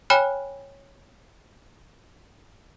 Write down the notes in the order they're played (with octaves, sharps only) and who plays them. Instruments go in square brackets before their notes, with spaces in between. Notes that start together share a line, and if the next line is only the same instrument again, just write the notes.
[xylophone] C#5 G5 G#5 B5 F6 F#6